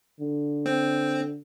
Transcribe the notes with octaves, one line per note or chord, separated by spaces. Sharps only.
D3
C4